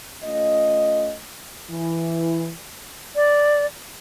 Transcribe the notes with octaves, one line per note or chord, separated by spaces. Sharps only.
A3 C#4 F4 D#5
E3
D5